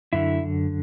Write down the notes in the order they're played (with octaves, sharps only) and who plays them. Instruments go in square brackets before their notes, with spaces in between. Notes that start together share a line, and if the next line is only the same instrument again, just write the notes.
[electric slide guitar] F#2 D3 E4